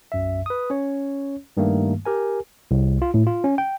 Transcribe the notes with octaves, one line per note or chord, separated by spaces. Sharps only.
B1 F#2 E5
B4 D#6
C#4 C#5
G2 D#3 G3 A3 A#3
G4 A#4 G#5
C2
F4
A2
F4
C#4
G5